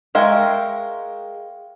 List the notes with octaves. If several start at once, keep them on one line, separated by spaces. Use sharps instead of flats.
G#3 A#4 E5 F5 G5 C#6